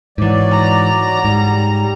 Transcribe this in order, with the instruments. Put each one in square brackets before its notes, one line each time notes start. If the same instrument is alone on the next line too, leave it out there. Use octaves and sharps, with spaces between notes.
[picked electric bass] G#2 E3 [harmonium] F#3 D5
[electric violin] A#5
[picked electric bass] G#2 [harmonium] G3